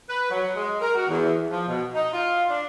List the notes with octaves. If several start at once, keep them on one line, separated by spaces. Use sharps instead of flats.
B4
F#3
G#3
A#4
F#4
E2
F3
B2
D#4
F4
D4